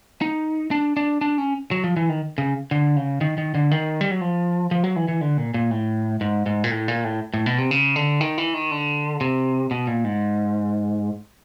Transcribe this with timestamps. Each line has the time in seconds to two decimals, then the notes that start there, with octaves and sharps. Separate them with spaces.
0.21 D#4
0.71 D4
0.97 D4
1.21 D4
1.38 C#4
1.71 F#3
1.84 F3
1.97 E3
2.09 D#3
2.38 C#3
2.71 D3
2.97 C#3
3.21 D#3
3.38 D#3
3.55 D3
3.71 D#3
4.01 G3
4.11 F#3
4.21 F3
4.71 F3
4.84 F#3
4.96 E3
5.08 E3
5.21 D3
5.38 A#2
5.54 A#2
5.71 A2
6.21 G#2
6.46 G#2
6.64 A#2
6.71 A2
6.88 A#2
7.04 A2
7.34 A2
7.46 B2
7.58 C3
7.71 C#3
7.96 D3
8.21 D#3
8.38 E3
8.54 D#3
8.71 D3
9.21 C3
9.71 B2
9.87 A#2
10.05 G#2